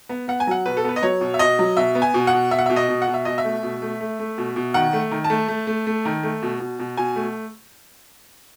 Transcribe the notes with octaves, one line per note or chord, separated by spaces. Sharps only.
B3
B3 F#5
G#5
F#3 F#5
B2 B4
A4
B3 B4
D#5
F#3 C#5
B2
E5
B2 D#5
F#3
B2 E5
B3
G#5
B2
F#5
B2
B2 E5
F#5
B2 E5
D#5
B2
F#5
B2
E5
B2 D#5
E5
A3
B2
A3
A3
A3
B2
B2
D#3 F#5
A3
D#3
A5
A3
A3
A3
A3
D#3
A3
B2
B2
B2
B2 G#5
A3